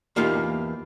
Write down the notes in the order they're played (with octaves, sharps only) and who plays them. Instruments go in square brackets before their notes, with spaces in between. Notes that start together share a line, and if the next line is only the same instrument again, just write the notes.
[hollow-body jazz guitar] E2 A#3 D#4 F4 G4